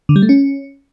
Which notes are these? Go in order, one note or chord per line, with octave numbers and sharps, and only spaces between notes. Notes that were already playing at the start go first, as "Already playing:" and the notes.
D3
G3
A3
C#4